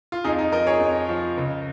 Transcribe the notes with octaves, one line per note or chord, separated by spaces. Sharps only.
F4
F2 D#4 G#4
D#4
F3 A#4 D#5
G#4 C#5
F2
F3
C#2